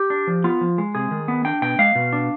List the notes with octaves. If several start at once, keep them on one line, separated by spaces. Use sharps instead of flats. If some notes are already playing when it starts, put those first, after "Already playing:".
Already playing: G4
D4
F3
B3 F4
F3
G#3
C3 G#4
D#3
B3
D4 G5
B2 G5
G#3 F5
B2
D4